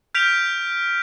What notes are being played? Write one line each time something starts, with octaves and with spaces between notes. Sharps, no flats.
F6 G6 B6 D7 F7